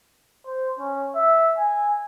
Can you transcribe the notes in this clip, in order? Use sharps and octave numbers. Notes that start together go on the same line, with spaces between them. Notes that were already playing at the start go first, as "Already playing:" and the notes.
C5
C#4
E5
G#5